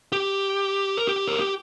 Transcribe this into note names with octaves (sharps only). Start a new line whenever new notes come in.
G4
A#4
G4
A#4
G4